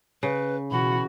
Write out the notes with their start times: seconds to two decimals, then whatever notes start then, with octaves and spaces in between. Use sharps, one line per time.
0.23 C#3 B4
0.71 B2 E3 F#4 B5